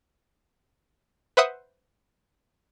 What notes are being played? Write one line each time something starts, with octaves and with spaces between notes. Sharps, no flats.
B4 C5 E5 F#5 D#6 F#6